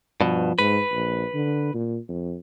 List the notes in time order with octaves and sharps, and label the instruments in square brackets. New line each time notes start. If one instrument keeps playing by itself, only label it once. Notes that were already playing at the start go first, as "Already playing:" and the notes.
[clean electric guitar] G2 B2 [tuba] F3
[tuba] G#2 [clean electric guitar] B4
[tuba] A#1
D3
A#2
F2